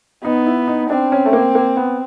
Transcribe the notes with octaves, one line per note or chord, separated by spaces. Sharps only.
B3 D#4
E4
D#4
C4 D4
C#4
A3
A#3
A#3
B3